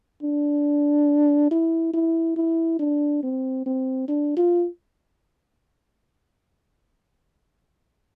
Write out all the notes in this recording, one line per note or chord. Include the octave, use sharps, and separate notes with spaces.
D4
E4
E4
E4
D4
C4
C4
D4
F4